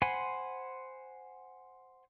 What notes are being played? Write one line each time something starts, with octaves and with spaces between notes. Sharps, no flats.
C5 F#5 G#5 B5 C6